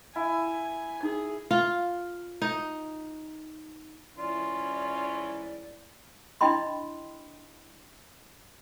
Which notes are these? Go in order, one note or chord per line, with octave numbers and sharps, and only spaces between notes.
E4 F5 G#5
D#4 G#4
F4
D#4
G#2 E3 C#4 E4 F4 D5
D4 E4 D#5 G5 B5 C6